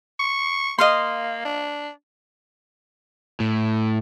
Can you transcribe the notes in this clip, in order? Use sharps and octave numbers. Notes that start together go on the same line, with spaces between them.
C#6
A#3 D#5 F5 C6
D4
A2